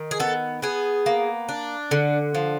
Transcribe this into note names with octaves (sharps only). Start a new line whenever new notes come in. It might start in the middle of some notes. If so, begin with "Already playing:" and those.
Already playing: D#3
G#4
B3 A4
B3 G#4
A#3
D4
D3
F3